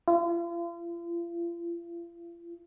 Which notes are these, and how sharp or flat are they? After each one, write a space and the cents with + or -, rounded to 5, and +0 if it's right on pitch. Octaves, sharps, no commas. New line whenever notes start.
F4 -40